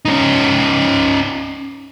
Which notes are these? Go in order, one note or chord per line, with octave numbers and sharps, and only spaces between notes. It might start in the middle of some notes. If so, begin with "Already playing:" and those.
C#4 D#4